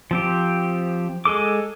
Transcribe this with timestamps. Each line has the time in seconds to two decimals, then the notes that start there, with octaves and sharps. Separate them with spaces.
0.11 F3 C4 G4
1.25 G#3 G#4 A4 D6